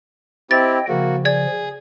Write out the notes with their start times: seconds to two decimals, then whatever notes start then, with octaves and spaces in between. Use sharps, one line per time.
0.51 C4 E4 G4 D#5 G5 A6
0.88 C#3 F3 A#3 F#4
1.25 G#4 D5 G#6